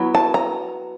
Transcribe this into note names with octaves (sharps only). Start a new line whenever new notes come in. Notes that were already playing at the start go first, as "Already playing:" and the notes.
Already playing: F#3 B3 E4
A5
A#5